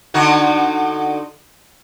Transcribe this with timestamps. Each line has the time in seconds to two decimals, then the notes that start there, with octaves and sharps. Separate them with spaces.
0.14 D3 D#4 F#4